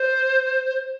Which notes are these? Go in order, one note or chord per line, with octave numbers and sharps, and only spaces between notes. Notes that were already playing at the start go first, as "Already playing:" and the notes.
Already playing: C5